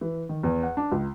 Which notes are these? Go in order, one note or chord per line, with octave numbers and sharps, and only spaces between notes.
E3
D#3
E2
F#5
D4
C#2